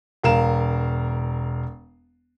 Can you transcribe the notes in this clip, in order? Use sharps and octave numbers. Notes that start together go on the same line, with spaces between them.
E1 A#4 F5 E7